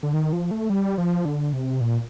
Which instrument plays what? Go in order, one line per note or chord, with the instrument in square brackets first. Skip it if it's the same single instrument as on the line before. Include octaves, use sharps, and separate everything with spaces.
[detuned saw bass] D3
D#3
F3
A3
G3
F3
D3
C3
A#2